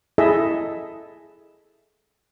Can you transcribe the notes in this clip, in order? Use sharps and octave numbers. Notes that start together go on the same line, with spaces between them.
E4 G#4 A4 D#5 E5